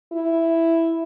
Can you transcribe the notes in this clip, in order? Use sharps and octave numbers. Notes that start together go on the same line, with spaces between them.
E4